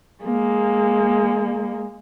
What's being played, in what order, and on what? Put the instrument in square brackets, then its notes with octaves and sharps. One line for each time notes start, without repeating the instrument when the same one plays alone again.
[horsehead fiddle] G#3 A#3